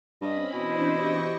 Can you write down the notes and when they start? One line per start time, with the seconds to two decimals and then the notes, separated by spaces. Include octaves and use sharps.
0.21 G2 C4 C#4 D#5 B5
0.54 B2 E3 D4 E4 C5 D#5
0.88 G4 G5 C#6